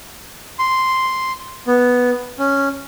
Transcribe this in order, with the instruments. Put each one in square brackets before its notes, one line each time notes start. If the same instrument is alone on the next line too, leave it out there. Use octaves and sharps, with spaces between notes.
[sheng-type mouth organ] C6
B3
C#4